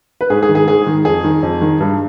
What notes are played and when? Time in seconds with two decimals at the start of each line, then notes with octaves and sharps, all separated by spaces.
0.21 B4
0.30 G#2 G#4
0.43 G#4
0.49 D#3
0.55 G#4
0.68 G#2 G#4
0.87 D#3
1.05 F2 G#4
1.24 D#3
1.43 F2
1.61 D#3
1.80 G2